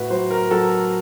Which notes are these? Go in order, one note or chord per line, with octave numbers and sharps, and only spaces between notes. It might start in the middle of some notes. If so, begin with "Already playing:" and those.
Already playing: A2 F#4 B4
F#3 C5
A#4
F#3 A4